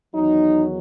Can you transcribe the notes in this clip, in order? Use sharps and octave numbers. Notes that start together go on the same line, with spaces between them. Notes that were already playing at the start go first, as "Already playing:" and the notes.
E2 D#3 F#3 D#4